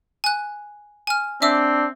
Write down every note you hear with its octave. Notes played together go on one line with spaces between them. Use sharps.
G#5 F#6
G#5 F6
C4 D4 E5 D6 E6